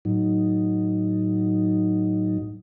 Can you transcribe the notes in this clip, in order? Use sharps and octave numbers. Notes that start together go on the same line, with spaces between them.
A2 F#3 D#4